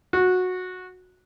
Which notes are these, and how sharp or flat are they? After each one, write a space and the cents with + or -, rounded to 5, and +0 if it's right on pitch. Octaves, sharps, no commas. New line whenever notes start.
F#4 -15